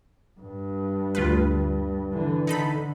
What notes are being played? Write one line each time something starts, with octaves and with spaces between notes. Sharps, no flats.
G2
D2 F4 B4
D3 E3
D3 D#4 A4 B5